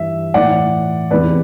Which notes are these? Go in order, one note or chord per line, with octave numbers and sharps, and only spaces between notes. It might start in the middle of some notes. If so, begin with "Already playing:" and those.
Already playing: G2 E3 E5
A2 E3 D5 F#5
E2 C3 E3 B4 D5